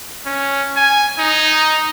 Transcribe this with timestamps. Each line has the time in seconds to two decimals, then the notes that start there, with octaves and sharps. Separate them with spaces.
0.26 C#4
0.76 G#5
1.19 D#4